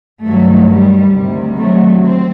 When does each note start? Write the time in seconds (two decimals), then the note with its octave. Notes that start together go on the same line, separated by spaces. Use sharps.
0.24 G2 D#3 F#3 A3
0.70 G3
1.14 D2 C3 D#3 G3
1.59 F#3 A3
2.03 C4